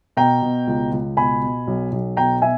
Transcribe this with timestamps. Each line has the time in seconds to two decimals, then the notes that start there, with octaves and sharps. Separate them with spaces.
0.17 B2 G5 A#5
0.42 B2
0.67 C#2
0.91 C#2
1.17 B2 G#5 B5
1.42 B2
1.67 B1
1.92 B1
2.17 B2 G5 A#5
2.42 B2 E5 G#5